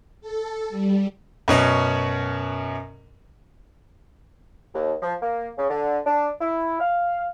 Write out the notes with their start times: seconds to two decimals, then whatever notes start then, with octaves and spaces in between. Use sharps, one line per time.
0.21 A4
0.70 G3
1.48 F#2 B2 C#4
4.74 D#2
5.02 F3
5.21 A#3
5.58 C#3
5.69 D3
6.06 D4
6.41 E4
6.80 F5